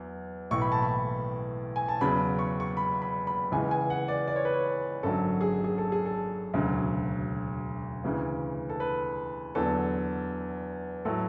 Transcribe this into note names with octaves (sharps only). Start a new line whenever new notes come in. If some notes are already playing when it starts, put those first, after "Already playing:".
Already playing: E2 F#3
B1 A2 E3 C#6
B5
A5
B5
G#5
A5
E2 C#3 F#3 B5
C#6
C#6
B5
B5
B5
C#2 C#3 E3 G#5
G#5
F#5
D5
D5
C#5
B4
C#5
G#1 F#2 D3 F#3 A4
G#4
G#4
A4
G#4
A4
E1 D2 C#3 F#3
D2 C#3 E3
A4
B4
E2 D3 F#3 A4
A2 F#3 A4